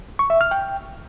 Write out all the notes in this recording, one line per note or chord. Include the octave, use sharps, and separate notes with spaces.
C#6
E5
F6
G5